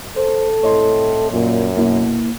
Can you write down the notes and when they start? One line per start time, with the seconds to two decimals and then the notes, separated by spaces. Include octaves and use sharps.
0.16 A4 C5
0.63 C2 A2 C#5 D#5 C6
1.31 F#2 A#2
1.77 B2 A#3 E4